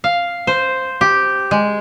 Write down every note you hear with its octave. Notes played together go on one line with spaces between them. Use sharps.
F5
C5
G4
G#3